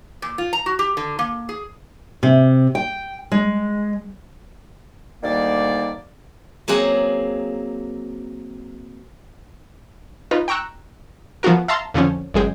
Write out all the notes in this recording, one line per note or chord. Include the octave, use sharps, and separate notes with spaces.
A#2
F4
A#5
F#4
G4
D3
A#3
G#4
C3
G5
G#3
D2 D#3 G3 A#3 D5
F#3 A#3 C4 G#4 F#5
D#4 F4 B4
G5 A#5 C#6 E6 F#6
F3 B3 F4 F#4 A#4
E5 F5 A5 A#5 C6
F2 D3 F3 C#4
G1 F#2 G#3 G#4 G5